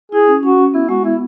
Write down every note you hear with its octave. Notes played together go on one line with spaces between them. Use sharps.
E4 G#4
C#4
C#4 F#4
C#4
B3 E4
G#3 F#4
B3 E4